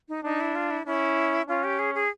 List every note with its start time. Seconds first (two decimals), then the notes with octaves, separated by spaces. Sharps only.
0.09 D#4
0.24 D4 D#4
0.40 E4
0.56 F4
0.71 E4
0.86 C#4 E4
1.48 C#4 F4
1.64 G4
1.79 G#4
1.95 G#4